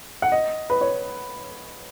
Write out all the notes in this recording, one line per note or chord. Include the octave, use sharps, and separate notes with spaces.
F#5
D#5
B4
C#5